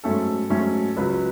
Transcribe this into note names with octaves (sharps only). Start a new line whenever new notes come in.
G#2 F#3 A3 C#4 A4
G#2 F#3 A3 C#4
C#2 C#3 F#3 B4